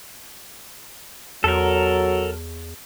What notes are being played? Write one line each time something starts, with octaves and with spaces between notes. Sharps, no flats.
E2 F#3 A4 A#4